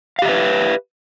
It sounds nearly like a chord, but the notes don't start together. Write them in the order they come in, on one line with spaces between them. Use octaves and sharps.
F5 G4 E5 B4